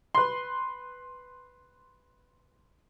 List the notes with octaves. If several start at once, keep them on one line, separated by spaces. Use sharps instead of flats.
B4 C6